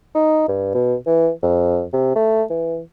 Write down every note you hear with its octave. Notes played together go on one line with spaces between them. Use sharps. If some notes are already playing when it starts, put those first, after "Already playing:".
D#4
G2
B2
E3
F2
C3
A3
E3